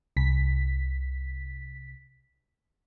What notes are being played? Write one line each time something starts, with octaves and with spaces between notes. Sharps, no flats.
C2 B6